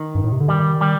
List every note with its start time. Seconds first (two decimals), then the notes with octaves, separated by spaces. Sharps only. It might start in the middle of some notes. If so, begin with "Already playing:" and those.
Already playing: D#3
0.15 G2
0.24 A2
0.32 C3
0.40 D3
0.48 D#3 G3
0.81 G3